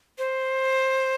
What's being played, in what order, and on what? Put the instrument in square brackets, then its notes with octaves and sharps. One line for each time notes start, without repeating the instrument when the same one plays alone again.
[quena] C5